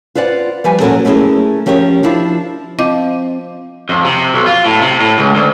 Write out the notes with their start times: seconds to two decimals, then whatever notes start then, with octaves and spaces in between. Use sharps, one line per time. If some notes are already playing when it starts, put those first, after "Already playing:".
0.15 F4 B4 C5 D5 F#5
0.64 F3 G3 B4 G#5
0.80 A#2 C#3 F#3 C#4 A4 A#4
1.05 A3 C#4 D#4 E4 G#4 A#4
1.66 F3 C#4 G4 A#4 C#5
2.03 F3 D4 E4 F4
2.79 F3 C4 D#5 D6
3.89 F2
4.05 C3
4.34 B1
4.46 F4
4.66 A2
4.81 C3
5.00 A2
5.18 C#2
5.35 D2